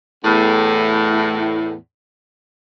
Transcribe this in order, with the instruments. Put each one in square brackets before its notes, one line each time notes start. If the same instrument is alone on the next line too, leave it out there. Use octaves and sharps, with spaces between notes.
[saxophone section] E2 A2